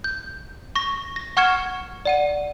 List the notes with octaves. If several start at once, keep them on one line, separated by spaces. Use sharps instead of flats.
G6
C#6 A#6
A#6
F#5 C#6 F6 G#6 C#7 E7
D5 F#5 D#7